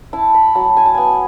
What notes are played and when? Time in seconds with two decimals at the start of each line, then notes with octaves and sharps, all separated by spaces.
0.13 E4 A5
0.34 B5
0.55 F#3 A5
0.77 G#5
0.86 A5
0.95 B3 G#5